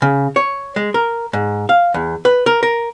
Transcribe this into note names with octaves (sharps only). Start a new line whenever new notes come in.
C#3
C#5
G#3
A#4
G#2
F5
E2
B4
A#4
A#4